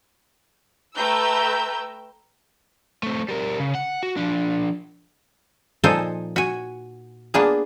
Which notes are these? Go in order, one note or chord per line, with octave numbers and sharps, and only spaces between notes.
A3 B4 G5 A#5 E6 G6
A3 C4
G3 A#4
C#3
F#5
F#4
F3 D4
A#2 F3 D#4 A4 C5 G#5
F#4 G#5
A#3 B3 D4 F4 G#4